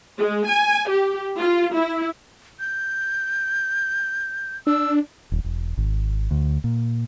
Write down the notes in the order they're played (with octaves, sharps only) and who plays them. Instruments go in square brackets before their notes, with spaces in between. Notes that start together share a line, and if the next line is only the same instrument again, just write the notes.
[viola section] G#3
G#5
G4
F4
E4
[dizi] G6
[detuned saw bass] D4 [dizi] E6
[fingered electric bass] D#1
E1
G#1
D2
A#2